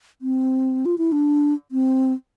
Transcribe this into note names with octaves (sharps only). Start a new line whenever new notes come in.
C4
F4
E4
D4
C4